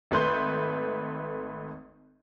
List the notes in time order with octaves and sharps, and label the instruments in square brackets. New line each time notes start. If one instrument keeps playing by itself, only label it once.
[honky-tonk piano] G#1 A3 B4 C6 G6